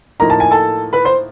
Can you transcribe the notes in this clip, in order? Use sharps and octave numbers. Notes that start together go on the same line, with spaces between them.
A2 F3 A#3 D#4 A#5
A5
G#5
A4 A5
B4 B5
C5 C6